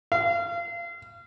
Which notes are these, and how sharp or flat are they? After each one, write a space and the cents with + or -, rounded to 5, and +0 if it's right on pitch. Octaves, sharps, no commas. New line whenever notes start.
F5 -30